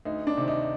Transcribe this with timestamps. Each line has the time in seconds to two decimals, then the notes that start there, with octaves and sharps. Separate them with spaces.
0.05 D2 D#4
0.27 D4
0.37 C3 D#3
0.48 D#4